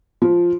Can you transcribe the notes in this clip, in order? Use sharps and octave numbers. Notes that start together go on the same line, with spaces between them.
F3